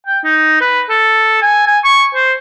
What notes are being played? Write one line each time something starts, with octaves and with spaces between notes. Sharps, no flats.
G5
D#4
B4
A4
G#5
G#5
C#6
C5